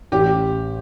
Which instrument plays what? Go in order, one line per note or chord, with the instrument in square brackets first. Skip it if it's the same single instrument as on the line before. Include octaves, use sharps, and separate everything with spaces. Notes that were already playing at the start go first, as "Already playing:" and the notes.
[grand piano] A1 [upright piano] G4